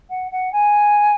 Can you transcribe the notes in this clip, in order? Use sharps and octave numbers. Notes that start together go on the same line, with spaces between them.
F#5
F#5
G#5